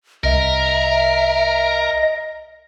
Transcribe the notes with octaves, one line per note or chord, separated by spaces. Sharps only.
C2 A#4 D#5 E5